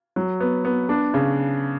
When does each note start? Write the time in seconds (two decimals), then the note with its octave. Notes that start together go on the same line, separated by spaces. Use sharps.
0.16 F#3
0.40 B3
0.65 B3
0.89 D4
1.14 C#3